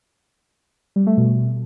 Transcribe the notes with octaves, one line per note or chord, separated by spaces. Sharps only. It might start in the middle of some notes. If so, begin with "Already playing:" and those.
G3
A3
B2